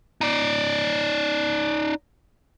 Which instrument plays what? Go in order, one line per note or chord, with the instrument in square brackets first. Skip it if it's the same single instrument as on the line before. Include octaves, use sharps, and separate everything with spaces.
[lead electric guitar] D#4 D5